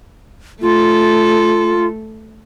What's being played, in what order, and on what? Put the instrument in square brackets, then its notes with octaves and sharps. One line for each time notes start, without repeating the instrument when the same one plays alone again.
[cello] A3 A4 [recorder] F4